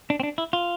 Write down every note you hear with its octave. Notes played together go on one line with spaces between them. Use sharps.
D4
C4
D4
E4
F4